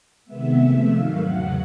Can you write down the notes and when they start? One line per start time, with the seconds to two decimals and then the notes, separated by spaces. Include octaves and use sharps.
0.25 C3 D#3 G#3 B3 E5
0.57 C3 F3 A3
0.88 G#2 D#3 F#3 F5
1.19 E2 C#3 F#3 F#5